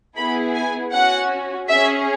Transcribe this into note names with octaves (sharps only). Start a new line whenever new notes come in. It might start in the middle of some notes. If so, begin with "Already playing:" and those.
B3 E4 G#4 B5
G#5
C#4 F#4 F#5
C#4 G#4 E5